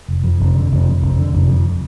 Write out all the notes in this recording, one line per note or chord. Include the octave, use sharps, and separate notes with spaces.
F1
F2
F1
D3
F1
F2
F1
D3
F1
F2